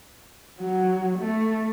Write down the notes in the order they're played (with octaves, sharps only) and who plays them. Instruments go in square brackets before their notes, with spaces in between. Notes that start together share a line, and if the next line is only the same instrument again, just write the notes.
[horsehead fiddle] F#3
A3